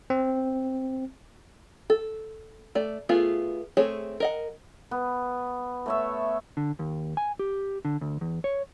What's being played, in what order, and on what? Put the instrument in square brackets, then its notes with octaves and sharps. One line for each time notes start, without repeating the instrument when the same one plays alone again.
[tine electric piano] C4
[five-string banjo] A4
A3 D5
A3 B3 F4 F#4 G#4
A3 C4 G#4 C#5
A#4 D#5 F#5
[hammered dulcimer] B3
A3 C#5 E5
[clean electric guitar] D3
D#2
G#5
G4
D3
D2
E2
C#5